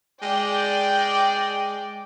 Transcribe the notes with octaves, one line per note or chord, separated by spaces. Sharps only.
G#3 D5 G5